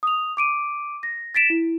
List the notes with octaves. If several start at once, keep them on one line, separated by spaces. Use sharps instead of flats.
D#6 F7
D6 D7 D#7
A#6
A6 B6 D7 E7
E4